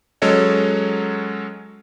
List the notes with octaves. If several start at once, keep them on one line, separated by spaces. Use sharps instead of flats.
F#3 G#3 C#4 A4 C#5 D#5